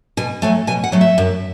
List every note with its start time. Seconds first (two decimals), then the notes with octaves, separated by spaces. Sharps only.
0.17 B2 G#5
0.42 F#3 A3 G#5
0.67 B2 G#5
0.84 F#5
0.92 F#3 A3
1.01 E5
1.18 F#2